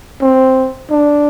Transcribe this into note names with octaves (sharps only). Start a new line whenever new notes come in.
C4
D4